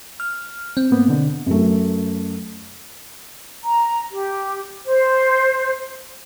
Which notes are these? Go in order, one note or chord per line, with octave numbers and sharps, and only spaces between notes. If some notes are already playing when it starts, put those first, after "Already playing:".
F6
C4
G#2 A#3 B3
B2 D3
F#2 A3
A#5
G4
C5